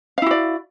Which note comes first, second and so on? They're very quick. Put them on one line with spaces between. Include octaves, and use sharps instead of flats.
F5 E4 F#4 D5